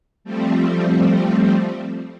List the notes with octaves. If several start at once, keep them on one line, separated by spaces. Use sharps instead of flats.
F3 G3 A3 C4